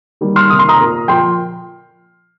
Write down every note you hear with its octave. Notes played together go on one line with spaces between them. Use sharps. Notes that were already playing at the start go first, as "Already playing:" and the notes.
D#3 G3 A#3
C6 F6
C3 D#3 A#3 D#6
C6
A#5 D#6
A#2 A#3
A#2 F3 A#3 G5 C6